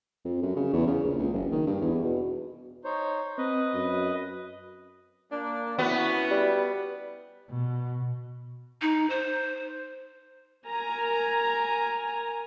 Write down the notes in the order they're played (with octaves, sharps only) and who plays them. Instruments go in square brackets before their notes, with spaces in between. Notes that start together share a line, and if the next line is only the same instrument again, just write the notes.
[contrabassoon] F2
F#2
C#3
E2
C#3
A#1
C#2
F#1
D#3
G2
E2
B2
[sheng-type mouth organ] D#4 C5 C#5
[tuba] C4 [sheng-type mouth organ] B4 D#5
[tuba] F#2
[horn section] A#3 D4
[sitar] B3 [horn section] C#4 E4 F#4
[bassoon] G3
[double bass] B2
[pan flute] D#4
C5
[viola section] A#4 G#5 A#5